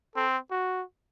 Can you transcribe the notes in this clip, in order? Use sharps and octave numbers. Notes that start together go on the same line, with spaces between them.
C4 A4
F#4